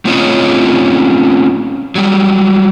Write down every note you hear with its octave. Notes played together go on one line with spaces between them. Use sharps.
A3 C4 C#4 F4 C#5 D#5
F#3 G3